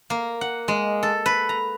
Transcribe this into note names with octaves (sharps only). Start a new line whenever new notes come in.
A#3
F#5
G#3
A4
B4
A#5